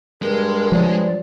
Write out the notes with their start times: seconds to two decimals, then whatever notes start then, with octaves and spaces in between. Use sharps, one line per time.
0.22 G2 G#3 A#4
0.72 F3 F#3 D5